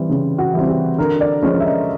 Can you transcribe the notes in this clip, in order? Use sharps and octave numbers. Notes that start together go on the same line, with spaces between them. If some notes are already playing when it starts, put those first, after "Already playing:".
Already playing: E3 G3 C4
C#3
F#4
E3 G3 C4
G4
D3 A#4
D5
F3 G#3 C#4
E5
D#5